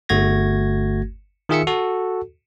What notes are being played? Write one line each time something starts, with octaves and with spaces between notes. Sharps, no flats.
G1 A3 F#4 G#6 A#6
D#3 F4 G#4 E5 E6 C#7
F#4 A4